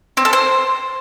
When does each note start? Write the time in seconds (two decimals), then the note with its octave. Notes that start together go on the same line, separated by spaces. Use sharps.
0.17 C4
0.25 A4
0.33 C5